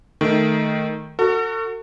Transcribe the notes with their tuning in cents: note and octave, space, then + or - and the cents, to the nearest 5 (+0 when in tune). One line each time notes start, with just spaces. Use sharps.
D#3 +0 A3 -5
F#4 +0 A4 +45